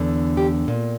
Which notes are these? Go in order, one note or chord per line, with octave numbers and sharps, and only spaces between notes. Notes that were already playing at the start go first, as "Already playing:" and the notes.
Already playing: E2 D3
G4
A#2